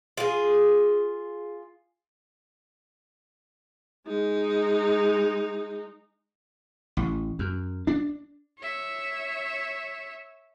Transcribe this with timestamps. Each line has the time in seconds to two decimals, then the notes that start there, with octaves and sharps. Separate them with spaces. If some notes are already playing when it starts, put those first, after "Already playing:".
0.17 F4 G#4
4.07 G#3 D#4
6.97 A1
7.39 F#2
7.87 D4
8.58 C#5 E5